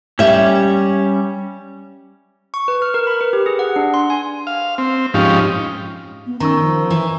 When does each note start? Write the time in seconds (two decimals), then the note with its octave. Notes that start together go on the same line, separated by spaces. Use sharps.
0.19 G3 C#4 G4 E5
2.54 C#6
2.68 B4
2.82 F6
2.94 A#4
3.07 B5
3.21 B4
3.33 G4
3.46 G#4
3.59 F#5
3.76 D4
3.94 C6
4.10 G#5
4.47 F5
4.78 C4
5.14 G#2 F3 C#4 D#4 G4 F5
6.26 B3
6.40 D#3 C#4 A#5 C#6 E6
6.61 F3
6.90 E3